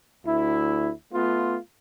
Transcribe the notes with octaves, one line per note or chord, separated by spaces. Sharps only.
D2 E4
A3 B3 F4